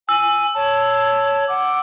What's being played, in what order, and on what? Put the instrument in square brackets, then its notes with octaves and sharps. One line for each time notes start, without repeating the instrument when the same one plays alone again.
[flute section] G#5 [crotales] E6
[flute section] C#5 A5
F#5 D6